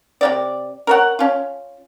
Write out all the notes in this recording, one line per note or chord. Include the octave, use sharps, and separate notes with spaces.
C3 A#3 D5
A#4 C#5 F#5
C#4 F4